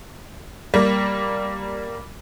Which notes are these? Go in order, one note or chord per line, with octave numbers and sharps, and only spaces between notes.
G3 A#3